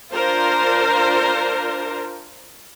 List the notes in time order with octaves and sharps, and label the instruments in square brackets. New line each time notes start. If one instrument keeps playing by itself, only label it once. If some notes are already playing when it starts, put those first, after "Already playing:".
[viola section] D4 F4 A#4 C5